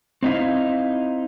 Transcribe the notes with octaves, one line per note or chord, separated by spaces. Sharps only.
C4 D#4 E4 F5